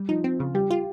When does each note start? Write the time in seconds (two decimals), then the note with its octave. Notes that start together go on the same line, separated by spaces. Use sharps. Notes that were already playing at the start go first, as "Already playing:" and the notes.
Already playing: G3
0.09 F3 D#4
0.24 C4
0.39 C#3 F4
0.55 G3 G4
0.71 F4